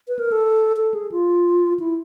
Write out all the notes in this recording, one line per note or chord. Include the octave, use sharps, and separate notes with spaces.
B4
A#4
A4
A4
G#4
F4
E4